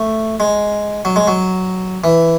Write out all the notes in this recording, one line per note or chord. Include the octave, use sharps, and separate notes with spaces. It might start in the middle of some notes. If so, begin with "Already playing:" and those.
Already playing: A3
G#3
F#3
G#3
F#3
E3